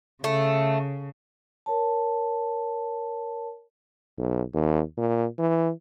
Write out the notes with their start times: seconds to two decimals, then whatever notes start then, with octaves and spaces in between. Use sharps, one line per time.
0.24 C#3 A3
1.66 A#4 C#5 A5
4.18 B1
4.54 D#2
4.98 A#2
5.39 E3